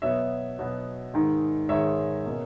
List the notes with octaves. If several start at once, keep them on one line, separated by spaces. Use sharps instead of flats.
B2 F#3 B3 C#5 E5
B2 F#3 B3
G#2 D#3 G#3
G#2 D#3 G#3 C#5 E5
B2 A#3 C#4